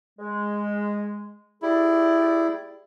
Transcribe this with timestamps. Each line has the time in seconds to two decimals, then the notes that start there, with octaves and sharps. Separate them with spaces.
0.19 G#3
1.62 E4 G4 G#4 D5